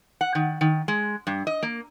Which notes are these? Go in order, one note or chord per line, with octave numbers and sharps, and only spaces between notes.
F#5
D#3
D#3
G#3
G2
D#5
A#3